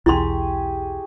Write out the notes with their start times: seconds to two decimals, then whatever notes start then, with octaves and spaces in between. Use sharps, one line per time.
0.06 B1 E2 E4 G4 G#4 C6 C#6